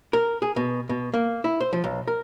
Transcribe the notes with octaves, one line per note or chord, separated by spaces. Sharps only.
A#4
G#4
B2
B2
A#3
E4
C5
F3
B1
A#4